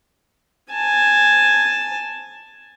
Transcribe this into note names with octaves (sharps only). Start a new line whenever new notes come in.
G#5 A5